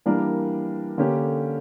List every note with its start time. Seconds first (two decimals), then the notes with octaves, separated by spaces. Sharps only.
0.06 E3 G3 A#3 D4 A#4
0.98 D3 A#3 C#4 G4